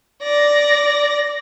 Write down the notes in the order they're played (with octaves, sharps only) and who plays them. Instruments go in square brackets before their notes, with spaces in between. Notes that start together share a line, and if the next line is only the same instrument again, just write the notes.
[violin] D5 A#6